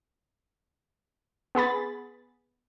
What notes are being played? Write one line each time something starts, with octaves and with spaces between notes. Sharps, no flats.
B3 G#4 B5 A6